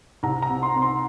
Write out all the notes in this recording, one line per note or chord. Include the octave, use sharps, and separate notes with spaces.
C2 A#5
A#5
C3
C6
C3
C6